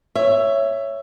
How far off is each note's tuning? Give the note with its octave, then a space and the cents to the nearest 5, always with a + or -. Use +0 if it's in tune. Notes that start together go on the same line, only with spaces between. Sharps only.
C#5 +0 E5 +10